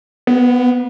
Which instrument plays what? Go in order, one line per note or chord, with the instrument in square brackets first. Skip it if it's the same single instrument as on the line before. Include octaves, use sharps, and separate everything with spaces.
[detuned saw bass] B3